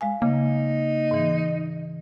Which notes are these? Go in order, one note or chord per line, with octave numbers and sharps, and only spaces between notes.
G#3 F5 G#5
C#3 A#3 D#4
G#2 E3